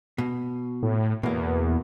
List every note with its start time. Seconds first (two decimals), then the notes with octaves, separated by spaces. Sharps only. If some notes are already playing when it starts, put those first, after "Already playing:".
0.18 B2
0.83 A2
1.23 E2 B2 A#3